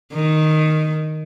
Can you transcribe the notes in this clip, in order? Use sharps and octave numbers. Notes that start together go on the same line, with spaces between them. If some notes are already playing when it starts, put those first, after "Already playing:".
D#3